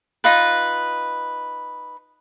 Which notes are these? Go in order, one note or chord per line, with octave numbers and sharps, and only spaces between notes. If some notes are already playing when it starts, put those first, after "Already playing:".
D#4 F4 B4